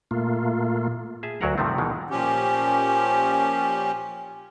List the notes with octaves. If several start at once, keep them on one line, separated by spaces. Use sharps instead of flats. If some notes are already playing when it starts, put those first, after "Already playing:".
A#2 A3 A#3 F4
G#4 E5 A5
D2 F#3 F#4 A#4 F#5 A#5
G2 C3 D#3 F3 A3 C4
B2 D#3 E3 G#3
A#2 F3 C#4 G4